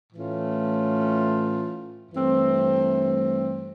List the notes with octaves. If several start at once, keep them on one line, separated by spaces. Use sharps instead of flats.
A2 E3 A3 C#4 F4
G2 E3 A3 C4